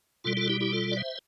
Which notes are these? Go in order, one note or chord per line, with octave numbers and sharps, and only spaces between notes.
B2 G3 F4 A4
F4 A4
E4 G4
E4 G4
F4 A4
D5
C5 E5